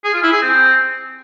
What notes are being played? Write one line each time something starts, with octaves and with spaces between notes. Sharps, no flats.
G#4
F4
E4
G#4
C4